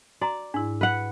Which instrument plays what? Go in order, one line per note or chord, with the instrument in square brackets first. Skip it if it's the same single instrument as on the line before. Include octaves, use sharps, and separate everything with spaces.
[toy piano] F#4 A#5 [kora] D5
[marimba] G#2 E4 [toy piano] D4
[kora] B4 F#5